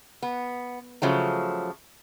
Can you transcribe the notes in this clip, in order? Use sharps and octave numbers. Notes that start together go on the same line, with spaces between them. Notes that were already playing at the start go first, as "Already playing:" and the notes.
B3
C#3 F3 F#3 A3